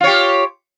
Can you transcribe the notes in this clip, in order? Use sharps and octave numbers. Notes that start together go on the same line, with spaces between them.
F4 G4 C#5